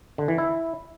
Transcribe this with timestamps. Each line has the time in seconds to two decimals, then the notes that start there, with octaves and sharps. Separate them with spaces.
0.18 D3
0.28 E3
0.38 E4